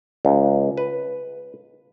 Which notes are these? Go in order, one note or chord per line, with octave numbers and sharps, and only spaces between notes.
C#2
B4